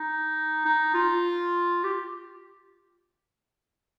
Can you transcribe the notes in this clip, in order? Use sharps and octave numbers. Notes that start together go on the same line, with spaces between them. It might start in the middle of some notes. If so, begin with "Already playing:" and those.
Already playing: D#4
D#4
F4
G4